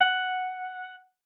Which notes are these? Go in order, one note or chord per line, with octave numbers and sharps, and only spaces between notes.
F#5